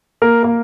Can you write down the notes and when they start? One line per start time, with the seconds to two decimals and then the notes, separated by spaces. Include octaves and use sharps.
0.22 A#3 A#4
0.43 A#3 A#4